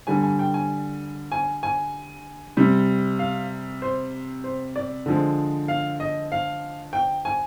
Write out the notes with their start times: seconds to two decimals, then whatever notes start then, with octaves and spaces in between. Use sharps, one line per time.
0.07 D3 G3 G#5
0.23 G#5
0.39 G5
0.54 G#5
1.32 G#5
1.63 G#5
2.57 C3 G3
3.19 F5
3.82 C5
4.44 C5
4.76 D5
5.06 D3 F3 G#3
5.68 F5
6.00 D#5
6.32 F5
6.93 G5
7.25 G#5